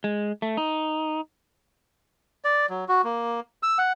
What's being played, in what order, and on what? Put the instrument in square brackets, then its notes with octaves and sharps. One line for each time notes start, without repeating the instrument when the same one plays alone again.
[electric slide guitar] G#3
A3
D#4
[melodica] D5
F#3
F#4
A#3
E6
F#5